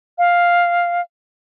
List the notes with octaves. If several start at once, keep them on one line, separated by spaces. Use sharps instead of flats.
F5